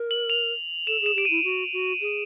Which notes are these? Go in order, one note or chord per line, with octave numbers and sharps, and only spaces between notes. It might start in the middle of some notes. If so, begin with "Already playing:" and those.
Already playing: A#4
F#7
F7
A4 E7
G#4 E7
G4 D7
E4 D#7
F#4
F#4
G#4